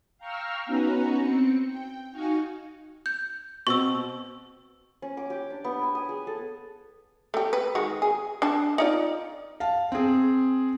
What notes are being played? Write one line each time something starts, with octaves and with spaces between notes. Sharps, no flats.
F5 G5 A#5 C#6 E6 F6
B3 C#4 D#4 F#4 B4 A#5
C4 C#7
G5
D#4 F#4 F5 G#5 C#6
G6
B2 C4 C#6 E6
C#4
D6
G4
D4
B3
G#5
D#6
G#4
A4
A3 G4
B4
D#3 G#3 F#4
G#4
D4 A5
D#4 F4 D5
F5 A5
C4 G#4